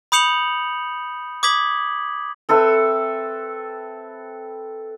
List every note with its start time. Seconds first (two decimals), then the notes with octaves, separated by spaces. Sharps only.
0.12 B5 D#6 G6 C#7 F7 F#7
1.43 D6 D#6 G#6 B6 F#7
2.49 C4 A4 B4 E5